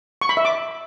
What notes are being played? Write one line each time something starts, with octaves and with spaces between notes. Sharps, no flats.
C#6
B5
E5
D6